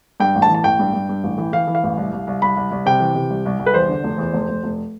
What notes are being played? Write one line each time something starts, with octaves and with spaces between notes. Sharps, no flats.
G2 G5
A1
A5
E3
A5
A1 G5
G2
G2
G2
A1
E3
E3 F5
E3
F5
A1
C2
C2
C2
C2 B5
C2
C2
C3 G5
E3
C3
C2
C2
C2
B4
E2 C5
D3
F1
E2
F1
F1
F1